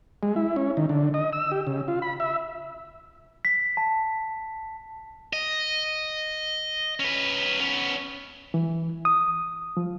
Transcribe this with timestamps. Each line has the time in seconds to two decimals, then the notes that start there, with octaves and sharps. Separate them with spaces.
0.23 G#3
0.36 E4
0.56 C#4
0.77 D#3
0.89 D3
1.14 D#5
1.33 E6
1.52 G4
1.67 C#3
1.88 F4
2.02 B5
2.20 E5
3.45 B6
3.77 A5
5.33 D#5
7.00 C#4 B4
7.60 B3 C#4
8.54 E3
9.05 D#6
9.77 F3